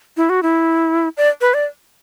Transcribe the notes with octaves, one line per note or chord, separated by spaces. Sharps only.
E4
F#4
E4
D5
B4
D5